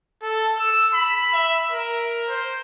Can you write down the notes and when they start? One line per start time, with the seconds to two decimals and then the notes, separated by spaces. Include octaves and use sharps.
0.23 A4
0.59 E6
0.93 B5
1.33 E5
1.72 A#4
2.28 C5